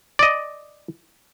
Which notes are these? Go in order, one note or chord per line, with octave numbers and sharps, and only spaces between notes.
D5 D#5